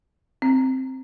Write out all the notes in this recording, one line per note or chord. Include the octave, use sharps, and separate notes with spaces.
C4